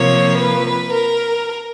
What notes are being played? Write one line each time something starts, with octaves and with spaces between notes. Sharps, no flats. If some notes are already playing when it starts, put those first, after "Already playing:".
Already playing: C3 F3 A#3 C#5
B4
A#4